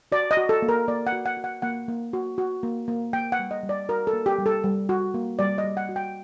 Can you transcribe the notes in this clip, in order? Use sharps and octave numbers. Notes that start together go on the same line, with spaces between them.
F#4 D5
D#5
F#4
A4
A#3
A#4
A#3 D5
F#5
F#4
F#5
F#4
F#5
A#3 F#5
A#3
F#4
F#4
A#3
A#3
A#3 G5
F#5
G3
D#5
G3
D5
F#4 A#4
A4
A#3
G4
G3
A4
G3
F#4
A#3
G3 D5
D#5
G3
F#5
F#4
G5